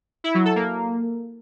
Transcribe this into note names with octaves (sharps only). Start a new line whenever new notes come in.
E4
F#3
A4
A#3